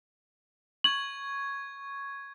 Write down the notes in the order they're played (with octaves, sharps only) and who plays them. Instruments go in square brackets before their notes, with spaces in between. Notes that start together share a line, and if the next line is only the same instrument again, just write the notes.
[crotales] C#6 G#6 [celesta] F#7